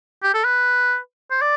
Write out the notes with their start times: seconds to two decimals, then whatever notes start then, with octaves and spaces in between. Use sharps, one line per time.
0.23 G4
0.34 A4
0.45 B4
1.31 C5
1.42 D5